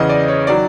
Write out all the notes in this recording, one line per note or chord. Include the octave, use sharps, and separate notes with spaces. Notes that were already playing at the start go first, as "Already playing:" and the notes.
Already playing: E2 C#3 E3 D#5
D5
C#5
D#3 F#3 D5